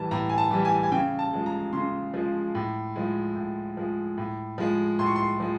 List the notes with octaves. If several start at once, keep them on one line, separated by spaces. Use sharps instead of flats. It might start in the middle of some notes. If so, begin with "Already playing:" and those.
Already playing: A2 E3 G3 A5
A2 A#5
G#5
A5
E3 G3
G#5
G#5
C#3 G5
A5
F3 G#3
A#5
C#3 C6
F3 G#3
A2
F3 G#3
A2
F3 G#3
A2
F3 G#3
A2 C6
C#6
C6
F3 G#3